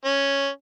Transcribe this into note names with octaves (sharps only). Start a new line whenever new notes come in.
C#4